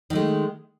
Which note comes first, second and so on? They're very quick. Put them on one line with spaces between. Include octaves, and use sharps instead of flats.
D#3 A3 G#3